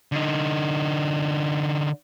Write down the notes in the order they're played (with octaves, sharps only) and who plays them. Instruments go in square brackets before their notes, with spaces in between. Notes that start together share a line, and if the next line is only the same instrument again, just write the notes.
[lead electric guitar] D3 D#4